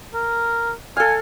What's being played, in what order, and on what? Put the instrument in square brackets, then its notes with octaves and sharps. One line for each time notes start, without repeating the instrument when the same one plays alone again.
[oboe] A#4
[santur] A4 F5 [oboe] G#5